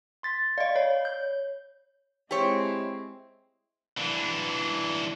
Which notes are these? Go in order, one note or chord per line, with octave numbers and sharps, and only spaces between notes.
C6 A6 B6
D5 D#5 F5
C#5
G6
G#3 C4 E4 G4 C#5
E3 D4